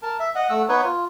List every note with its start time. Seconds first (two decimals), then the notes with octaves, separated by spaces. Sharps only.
0.03 A#4 A5
0.20 E5
0.35 D#5 F#5
0.50 A3 F#5 E6
0.69 B3 D#4 B4 C#5
0.84 F4